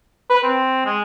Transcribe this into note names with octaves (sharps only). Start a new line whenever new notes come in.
B4
C4
G#3